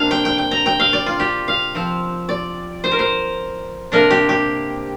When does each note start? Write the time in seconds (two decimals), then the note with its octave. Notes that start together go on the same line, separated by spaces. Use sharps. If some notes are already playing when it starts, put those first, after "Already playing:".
Already playing: C3 A#3 D4 F5
0.11 G5
0.25 G5
0.38 G5
0.51 A#5
0.66 G5
0.80 F5
0.93 D5
1.06 F4
1.20 G4
1.48 F5
1.75 F3 C4
2.29 D5
2.84 C5
2.91 A#4
2.99 C5
3.92 C3 A#3 D4 A#4
4.10 G4
4.29 G4